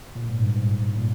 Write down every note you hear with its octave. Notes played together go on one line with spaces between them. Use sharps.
A#2
G#2
G2
G#2
A#2